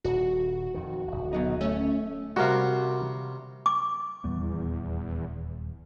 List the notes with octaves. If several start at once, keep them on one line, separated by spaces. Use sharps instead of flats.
D#1 F#4
F2 D#3
D1 G#1
B2 F#3 D#4
A3 C#4
C3 G3 F#4 A#4 F5
D6
D#1 E2 G3 B3